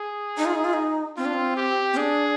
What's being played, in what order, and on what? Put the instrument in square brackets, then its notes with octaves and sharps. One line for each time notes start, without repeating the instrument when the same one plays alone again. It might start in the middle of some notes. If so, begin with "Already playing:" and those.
Already playing: [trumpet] G#4
[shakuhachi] D#4
F4
D#4
F4
D#4
[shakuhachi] C4 [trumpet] F4
[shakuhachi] D4
C4
[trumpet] G4
[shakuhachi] C4
[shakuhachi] D4 [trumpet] G#4